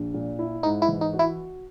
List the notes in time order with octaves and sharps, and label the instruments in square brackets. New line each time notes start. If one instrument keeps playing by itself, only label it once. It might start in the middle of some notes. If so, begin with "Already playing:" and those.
Already playing: [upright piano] A#1
A#2
E4
[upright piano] G#2 [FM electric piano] D#4
[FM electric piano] E4
[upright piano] E3
[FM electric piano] D#4
[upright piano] F#4
[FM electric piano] E4